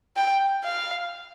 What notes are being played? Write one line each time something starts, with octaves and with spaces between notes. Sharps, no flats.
G5
F5